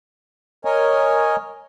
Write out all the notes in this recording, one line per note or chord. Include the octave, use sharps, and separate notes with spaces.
A#4 C#5 D#5 G#5